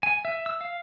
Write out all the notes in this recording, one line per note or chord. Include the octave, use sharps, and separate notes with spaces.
G#5
E5
E6
F5